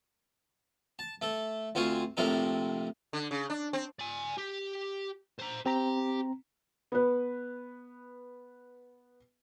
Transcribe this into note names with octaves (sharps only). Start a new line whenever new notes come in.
A5
A3 A4
D2 C4 F4 C5 G#5 C#6
A#1 A2 C3 C4 A4 A#4
D3
C#3
D4
C4
D5 G#5
G4
C5 A#5
C4 G4 A#5
B3 B4